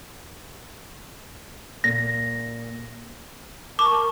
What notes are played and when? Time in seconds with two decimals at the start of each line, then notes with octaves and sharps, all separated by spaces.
1.84 A#2 A#6
3.79 A#4 A5 C#6 D6